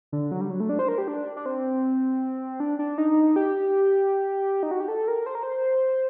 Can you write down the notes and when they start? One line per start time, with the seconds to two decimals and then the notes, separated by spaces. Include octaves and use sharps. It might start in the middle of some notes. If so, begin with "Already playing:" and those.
0.12 D3
0.32 F#3
0.41 G3
0.50 F#3
0.60 A3
0.69 D4
0.79 C5
0.88 A#4
0.98 G4
1.08 D4
1.36 D4
1.46 C4
2.60 D4
2.79 D4
2.98 D#4
3.36 G4
4.63 D#4
4.71 F#4
4.80 G4
4.88 A4
5.08 A#4
5.26 C5
5.35 A#4
5.43 C5